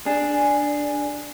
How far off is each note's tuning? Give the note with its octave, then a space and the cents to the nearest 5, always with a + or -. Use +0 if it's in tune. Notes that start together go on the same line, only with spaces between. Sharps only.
D4 +0 G#4 +0